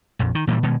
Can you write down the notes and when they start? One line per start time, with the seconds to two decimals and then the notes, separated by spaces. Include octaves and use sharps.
0.19 A#1 F2
0.35 D#3
0.47 A#2 E3 F3 G3
0.63 B2 D#3 G#3